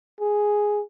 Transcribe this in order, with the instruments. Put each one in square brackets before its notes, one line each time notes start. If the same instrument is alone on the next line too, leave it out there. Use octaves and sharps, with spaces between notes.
[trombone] G#4